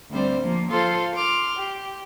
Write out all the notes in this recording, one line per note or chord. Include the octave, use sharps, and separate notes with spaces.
D2 G3 C4 C5 D5
F3 A#3
F4 A4 C5 F5 C6
C6 D6 F6
G4